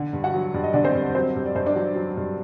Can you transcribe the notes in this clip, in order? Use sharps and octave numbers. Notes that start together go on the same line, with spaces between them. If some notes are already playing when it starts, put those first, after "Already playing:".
Already playing: D3
G2
F#4 F#5
F#3
G2 D5
D#5
D3 D4 D5
C4 C5
G2
F#3 C4 C5
G2
D5
G2 C5
D4 D5
F#3
F#3
G2